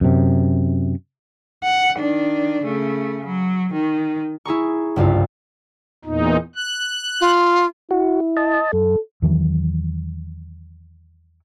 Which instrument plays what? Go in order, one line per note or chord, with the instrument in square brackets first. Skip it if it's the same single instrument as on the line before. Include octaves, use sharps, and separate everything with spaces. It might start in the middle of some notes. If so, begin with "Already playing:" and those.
[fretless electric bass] F#2 C3
[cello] F#5
D#3 D4
C#3 A3
F#3
D#3
[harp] E4 G#4 A#5 C#6
F#1 C2 G2 F4
[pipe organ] E2 A#2 D#4
F#6
[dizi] F4
[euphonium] E4 [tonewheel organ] F#4
[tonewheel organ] D#5 A5
[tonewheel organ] F#2 [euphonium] A4
[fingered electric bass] E2 D#3 E3 F#3